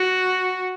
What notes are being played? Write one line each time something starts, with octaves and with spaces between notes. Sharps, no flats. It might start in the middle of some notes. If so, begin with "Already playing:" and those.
Already playing: F#4